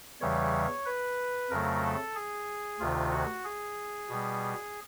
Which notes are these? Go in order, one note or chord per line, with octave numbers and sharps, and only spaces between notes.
E2 C#3 E3 G3 C#5
B4
F2 C#3 F#3 A3 A#4
A4
G#4
D2 C3 D#3 F4
F#4
G#4
B2 G3